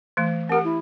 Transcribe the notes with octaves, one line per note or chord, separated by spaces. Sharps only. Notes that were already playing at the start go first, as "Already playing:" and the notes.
E3 A3
C4 G4 A#4 F#5
E4